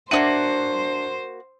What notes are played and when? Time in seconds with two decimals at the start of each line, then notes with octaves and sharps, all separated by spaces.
0.11 A#3 B3 D4 F#4 C5 E5 D#7